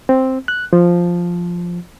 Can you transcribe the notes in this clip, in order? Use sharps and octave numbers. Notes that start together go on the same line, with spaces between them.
C4
F#6
F3